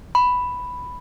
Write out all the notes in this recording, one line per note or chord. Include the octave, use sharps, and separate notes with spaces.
B5